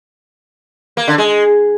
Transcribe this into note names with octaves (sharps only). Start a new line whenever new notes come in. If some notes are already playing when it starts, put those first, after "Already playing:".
A#3
D3
G#3